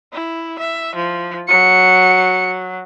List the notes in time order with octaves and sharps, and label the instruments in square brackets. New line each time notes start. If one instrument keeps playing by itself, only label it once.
[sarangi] E4
E5
F3
[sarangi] F#3 [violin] C#7